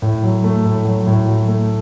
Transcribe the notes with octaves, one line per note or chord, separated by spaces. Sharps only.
A2
F#3
A3
A2
F#3
A2
F#3
A3